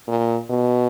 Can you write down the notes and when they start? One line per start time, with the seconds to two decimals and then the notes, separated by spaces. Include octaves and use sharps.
0.08 A#2
0.50 B2